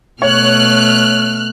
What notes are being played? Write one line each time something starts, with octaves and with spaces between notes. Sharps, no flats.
B2 A3 C#5 F6 F#6